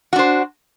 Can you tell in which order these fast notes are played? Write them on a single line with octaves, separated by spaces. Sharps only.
F#4 D4 C5